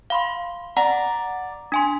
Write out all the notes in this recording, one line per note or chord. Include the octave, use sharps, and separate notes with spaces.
F5 B5 C6
D5 F#5 A#5
D4 G#5 C6